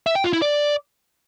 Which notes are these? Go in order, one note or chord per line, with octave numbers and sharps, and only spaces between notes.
E5
G5
F4
E4
D5